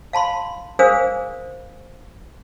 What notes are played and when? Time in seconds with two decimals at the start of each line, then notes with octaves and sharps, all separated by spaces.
0.13 F5 A5 B5 C6
0.79 D4 G#4 A#4 C5 F5 D#6